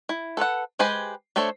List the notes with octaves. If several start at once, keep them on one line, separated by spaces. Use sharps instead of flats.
E4
A4 B4 C#5 F#5
G#3 G4 B4 C5 G#5
A3 D4 A4 C5 C#5